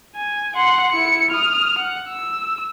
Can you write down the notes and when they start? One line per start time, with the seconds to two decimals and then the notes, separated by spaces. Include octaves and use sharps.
0.16 G#5
0.56 F#5 C6
0.92 E4 C#7
1.30 D#6 F6
1.78 F#5
2.09 E6